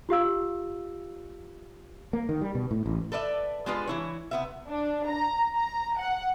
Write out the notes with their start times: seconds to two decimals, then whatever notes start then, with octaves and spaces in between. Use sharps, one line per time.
0.09 F4 G4 F5 E6
2.13 A#3
2.29 D#3
2.41 G3
2.55 B2
2.71 A2
2.86 A1
3.12 A4 B4 D5 E5
3.66 G#3 B3 D4 F4 G4 B4
3.87 E3 E4 C#5
4.31 C3 B3 E5
4.68 D4
5.08 A#5
5.56 A#5
5.99 F#5